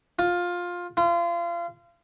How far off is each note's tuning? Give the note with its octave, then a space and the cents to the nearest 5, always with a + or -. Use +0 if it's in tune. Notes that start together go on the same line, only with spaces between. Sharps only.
F4 +15
F4 -30